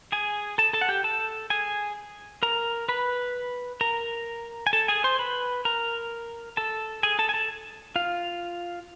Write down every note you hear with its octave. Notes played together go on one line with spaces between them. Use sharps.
G#4 G#5
A4 A5
A4 A5
F#5
G4 G5
A4 A5
G#4 G#5
A#4 A#5
B4 B5
A#4 A#5
G#5
A4 A5
G#4 G#5
C5 C6
B4 B5
A#4 A#5
A4 A5
G#4 G#5
A4 A5
G#5
A4 A5
F4 F5